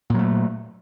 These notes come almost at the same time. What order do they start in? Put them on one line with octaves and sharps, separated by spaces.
A#2 F#3 A3